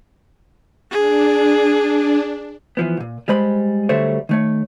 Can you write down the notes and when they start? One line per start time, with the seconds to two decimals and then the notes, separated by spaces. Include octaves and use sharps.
0.91 D4 G#4
2.77 E3 F3 B3
2.97 C2 A#2
3.28 G3 G#3 C5 B5
3.89 D3 F#3 G3 A3 C5 C#5
4.29 D#3 A3 C#5